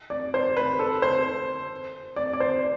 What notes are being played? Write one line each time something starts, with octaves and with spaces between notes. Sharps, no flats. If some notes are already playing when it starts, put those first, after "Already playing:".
D5
C5
B4
A4
C5
D5
D5
C5